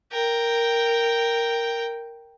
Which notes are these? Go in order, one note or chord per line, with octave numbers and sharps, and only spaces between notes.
A#4 G5